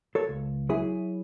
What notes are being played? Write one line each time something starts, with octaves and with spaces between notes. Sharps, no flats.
A4 C#5
C#2
F#3 E4 G#4